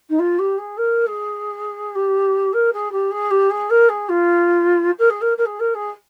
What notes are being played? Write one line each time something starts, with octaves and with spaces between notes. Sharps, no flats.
D#4
F4
G4
G#4
A#4
G#4
G4
A#4
G#4
G4
G#4
G4
G#4
A#4
G#4
F4
A#4
G#4
A#4
A#4
G#4
A#4
G#4